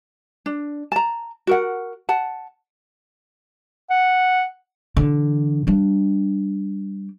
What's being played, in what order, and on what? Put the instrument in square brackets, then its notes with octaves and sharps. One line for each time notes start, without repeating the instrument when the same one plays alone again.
[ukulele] D4
A5 A#5
F#4 A#4 F#5
F#5 A5
[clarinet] F#5
[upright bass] D3 E3
G3 D4